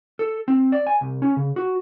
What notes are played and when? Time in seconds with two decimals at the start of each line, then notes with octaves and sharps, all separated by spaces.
0.19 A4
0.48 C4
0.72 D5
0.87 G#5
1.01 C2
1.22 C#4
1.37 C#3
1.56 F#4